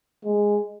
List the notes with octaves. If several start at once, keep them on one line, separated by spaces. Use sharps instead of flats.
G#3